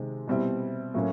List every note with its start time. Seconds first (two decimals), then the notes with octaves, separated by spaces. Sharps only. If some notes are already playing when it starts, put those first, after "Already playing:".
Already playing: C3 D#3 G#3 C4
0.27 B2 G3 C4 E4
0.94 A2 F#3 A#3 C#4